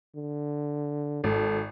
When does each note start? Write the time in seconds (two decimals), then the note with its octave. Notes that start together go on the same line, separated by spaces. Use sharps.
0.16 D3
1.24 G#1 A4